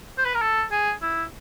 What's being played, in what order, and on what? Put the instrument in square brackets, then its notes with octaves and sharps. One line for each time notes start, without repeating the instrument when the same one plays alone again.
[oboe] C5
B4
A#4
A4
G#4
E4